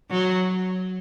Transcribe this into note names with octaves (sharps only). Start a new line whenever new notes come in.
F#3